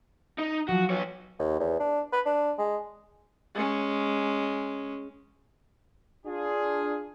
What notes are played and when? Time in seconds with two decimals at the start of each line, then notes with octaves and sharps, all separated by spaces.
0.39 D#4
0.69 F3 F#3 F#4
0.90 B3 C#5
1.39 D#2
1.60 E2
1.80 D4
2.13 B4
2.25 D4
2.58 G#3
3.55 G#3 C#4
6.26 D4 F4 G#4